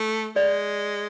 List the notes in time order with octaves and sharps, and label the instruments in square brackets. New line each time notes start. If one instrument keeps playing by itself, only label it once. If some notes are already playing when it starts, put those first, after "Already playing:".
Already playing: [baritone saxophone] A3
[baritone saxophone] G#3 [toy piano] D5